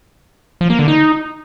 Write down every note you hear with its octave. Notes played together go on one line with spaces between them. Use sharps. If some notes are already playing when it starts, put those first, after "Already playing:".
F3
A#3
D3
D#4